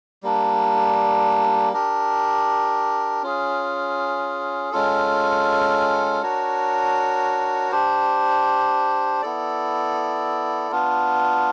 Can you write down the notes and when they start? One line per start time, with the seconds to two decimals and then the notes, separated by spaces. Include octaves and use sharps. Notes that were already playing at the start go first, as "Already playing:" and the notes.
0.23 G3 A#3 D4
1.73 D4 G4 A#4
3.23 C#4 F4 G#4
4.72 G#3 C#4 F4 A4
6.22 D4 F#4 A#4 C#5
7.72 D4 G4 C5
9.22 B3 E4 A4 D5
10.71 B3 D4 F4